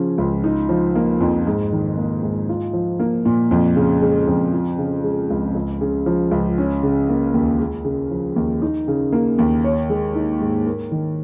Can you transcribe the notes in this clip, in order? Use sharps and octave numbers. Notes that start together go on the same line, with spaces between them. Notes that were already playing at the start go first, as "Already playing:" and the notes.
Already playing: C#3 F3 C#4
C#2
D#4
F3
A#3
F2
G#2
D#3
A#3
G#2
F4
F3
A#3
A#2
F2
C#3
G#3
F2
F4
C#3
G#3
C#2
C#2
C#3
F3
C#2
C#4
C#3
A#3
D#2
G#3
C#3
F3
D#2
D#4
C#3
A#3
D#2
C#5
G#3
D#4
G#2
A#4
D#3